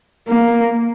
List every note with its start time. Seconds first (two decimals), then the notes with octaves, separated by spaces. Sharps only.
0.28 A#3